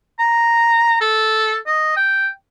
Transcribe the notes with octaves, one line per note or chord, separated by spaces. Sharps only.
A#5
A4
D#5
G5